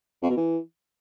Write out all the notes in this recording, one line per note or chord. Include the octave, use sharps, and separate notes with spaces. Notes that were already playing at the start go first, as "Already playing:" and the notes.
F2
B2
E3